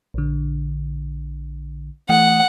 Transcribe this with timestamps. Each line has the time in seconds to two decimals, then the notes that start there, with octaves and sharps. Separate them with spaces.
0.14 A#1 D3
2.09 E3 A3 F#5 D#6